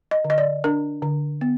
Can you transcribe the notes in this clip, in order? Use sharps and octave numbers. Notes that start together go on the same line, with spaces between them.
D#5
D3
D#5
D5
D4 A#4
D3
B3